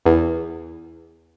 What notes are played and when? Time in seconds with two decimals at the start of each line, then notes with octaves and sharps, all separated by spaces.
0.06 E2